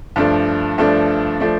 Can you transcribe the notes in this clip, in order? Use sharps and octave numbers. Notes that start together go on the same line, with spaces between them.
G2 F3 A3 D4
G2 F3 A3 D4
F3 A3 D4